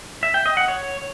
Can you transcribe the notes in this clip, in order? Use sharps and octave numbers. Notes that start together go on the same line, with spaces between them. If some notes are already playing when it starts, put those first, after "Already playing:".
E5
G5
D#5
F#5
C#5